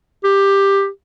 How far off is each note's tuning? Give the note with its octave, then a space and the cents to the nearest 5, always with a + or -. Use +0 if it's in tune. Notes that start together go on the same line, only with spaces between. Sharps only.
G4 +10